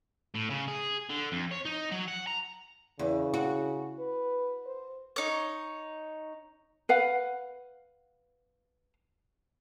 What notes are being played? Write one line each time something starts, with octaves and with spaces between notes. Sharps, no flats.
A2
C#3
G#4
D3
F2
C#5
D#4
F#3
F#5
A#5
E2 C#3
F#4
B4
C5
D#4 C#5
B4 F5 F#5